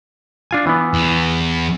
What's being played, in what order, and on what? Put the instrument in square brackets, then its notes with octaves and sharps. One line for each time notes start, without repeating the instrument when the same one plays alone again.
[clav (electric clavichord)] D4 F4 G#5
E3 B3
[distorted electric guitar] E2